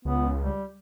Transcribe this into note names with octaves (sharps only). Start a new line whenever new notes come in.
C#2 B3
G3